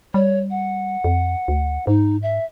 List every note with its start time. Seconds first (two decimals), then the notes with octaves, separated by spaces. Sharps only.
0.14 G3 C#5
0.50 F#5
1.04 F2
1.48 D2
1.87 G#2 D#4
2.22 E5